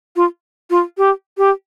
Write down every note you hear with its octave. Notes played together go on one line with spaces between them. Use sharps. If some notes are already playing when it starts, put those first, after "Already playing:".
F4
F4
G4
G4